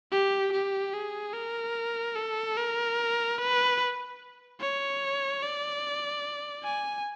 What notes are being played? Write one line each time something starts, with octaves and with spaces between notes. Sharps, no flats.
G4
G4
G#4
A#4
A4
A#4
B4
C#5
D5
G#5